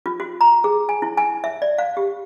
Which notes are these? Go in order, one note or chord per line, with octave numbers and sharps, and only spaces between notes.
F4
F#4
A#5
G#4
G#5
E4
G#5
E5
D5
F5
G4